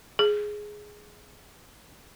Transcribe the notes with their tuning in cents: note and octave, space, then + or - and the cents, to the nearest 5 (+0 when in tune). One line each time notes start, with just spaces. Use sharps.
G#4 +5